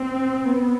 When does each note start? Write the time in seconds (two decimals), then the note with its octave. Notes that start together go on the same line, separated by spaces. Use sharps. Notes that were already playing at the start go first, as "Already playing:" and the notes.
Already playing: C4
0.45 B3